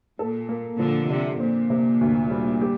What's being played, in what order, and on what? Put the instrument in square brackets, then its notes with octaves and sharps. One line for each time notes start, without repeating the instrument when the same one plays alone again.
[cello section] A#2 [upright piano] A4
[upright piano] A#3
[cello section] A#2 D3 [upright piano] F3
[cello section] C3 [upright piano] D4
[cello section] A#2 [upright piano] C4
[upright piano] C3
D2
G3
G4